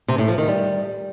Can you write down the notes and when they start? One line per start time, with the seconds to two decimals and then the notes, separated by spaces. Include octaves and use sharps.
0.08 C3
0.18 A2
0.28 F3
0.38 D#3
0.48 G3